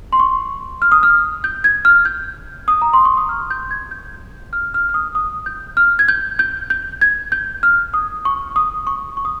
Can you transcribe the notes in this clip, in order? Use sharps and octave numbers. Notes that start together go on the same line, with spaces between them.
C6
C#6
F6
D#6
F6
G6
G#6
F6
G6
D#6
A#5
C6
C#6
D#6
F6
G6
G#6
G6
F6
F6
F6
D#6
D#6
G6
F6
G#6
G6
G6
G6
G#6
G6
F6
D#6
C#6
D#6
C#6
C#6
D#6